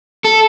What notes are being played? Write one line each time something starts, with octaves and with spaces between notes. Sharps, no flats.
A4